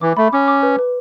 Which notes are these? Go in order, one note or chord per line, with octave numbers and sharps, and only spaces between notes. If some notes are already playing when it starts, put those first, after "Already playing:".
E3 D6
A3 B5
C#4 D6
D6
B4
B4